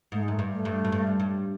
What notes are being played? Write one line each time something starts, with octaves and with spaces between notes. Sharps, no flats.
G#2 A3
G#3
F#2 A3
G2
A3
G2
F#2
G2
G2